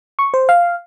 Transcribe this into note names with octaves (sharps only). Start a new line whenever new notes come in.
C#6
C5
F5